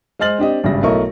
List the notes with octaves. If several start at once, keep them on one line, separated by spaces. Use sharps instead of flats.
G#3 C5 D#5 F6 A6 F#7
C4 D4 G4 D#5
G#1 G2 C#3 G3 E5 A#6
B1 A3 E4 A#4 D#5 C#6